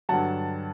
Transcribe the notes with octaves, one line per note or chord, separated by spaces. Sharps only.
G2 D3 F#3 F#5 A5